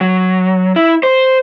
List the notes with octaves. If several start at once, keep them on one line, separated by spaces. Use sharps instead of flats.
F#3
E4
C5